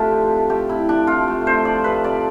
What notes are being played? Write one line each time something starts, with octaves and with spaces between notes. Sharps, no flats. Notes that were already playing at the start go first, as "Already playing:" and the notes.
Already playing: C3 A3 D4 F4 G4 A4
F3
C3
A3 G4
C3 E4
F3 D4
C3 F4
A3
C3 C5
F3 D5
C3 B4
C3 D5